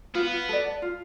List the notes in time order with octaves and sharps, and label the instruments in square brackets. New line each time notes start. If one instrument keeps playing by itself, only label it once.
[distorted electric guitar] B3 [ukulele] F4
[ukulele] A4 D5
F4